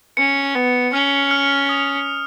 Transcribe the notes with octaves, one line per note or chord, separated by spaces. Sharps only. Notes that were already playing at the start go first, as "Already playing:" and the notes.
C#4 C#7
B3
C#4 F6
F6
D#6